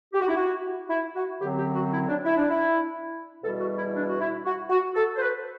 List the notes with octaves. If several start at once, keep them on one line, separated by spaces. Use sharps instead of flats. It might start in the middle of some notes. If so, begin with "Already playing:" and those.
G4
F#4
E4
F#4
E4
F#4
F#2 D3 F#3 C4 G4
G4
F#4
E4
D4
E4
D4
E4
E2 B2 G3 A4
F#4
E4
D4
F#4
E4
F#4
F#4
A4
C5
B4